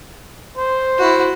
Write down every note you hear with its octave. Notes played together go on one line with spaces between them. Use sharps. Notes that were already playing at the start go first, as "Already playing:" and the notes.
C5
E4 F#4